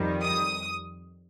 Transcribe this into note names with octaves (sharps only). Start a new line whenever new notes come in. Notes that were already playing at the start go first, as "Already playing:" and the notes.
Already playing: F2 D#3 G3
D#6